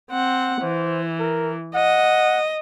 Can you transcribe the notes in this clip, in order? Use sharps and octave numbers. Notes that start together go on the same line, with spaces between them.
C4 F#5
E3 C5
A#4
D#5 F#5